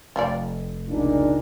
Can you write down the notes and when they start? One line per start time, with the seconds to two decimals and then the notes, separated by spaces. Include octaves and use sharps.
0.16 F1 G3 F4 D5
0.88 C#2 A#2 D4 D#4